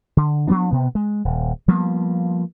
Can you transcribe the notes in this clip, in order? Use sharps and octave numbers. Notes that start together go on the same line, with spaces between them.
D3
F3 F#3 B3 D4
B2 B3
G#3
D#1
F3 G3 A#3 B3